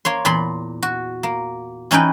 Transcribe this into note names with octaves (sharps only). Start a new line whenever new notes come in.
A#3 C#5 C6
E2 A#2 B5 C6
F#4
A#3
E3 C#4 D#4 B4 G5